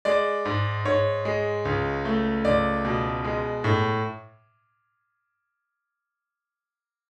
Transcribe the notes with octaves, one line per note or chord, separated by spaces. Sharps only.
G#3 D5
G#2
G#2 C#5
G#3
C#2
A3
C#2 D5
B2
G#3
A2